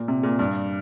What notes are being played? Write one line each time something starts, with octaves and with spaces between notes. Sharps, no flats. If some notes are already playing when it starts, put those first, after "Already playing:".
Already playing: A#2
C3
A#2
G2